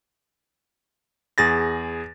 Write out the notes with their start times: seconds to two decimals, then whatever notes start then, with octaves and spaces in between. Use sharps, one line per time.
1.38 E2 G#4 A6 A#6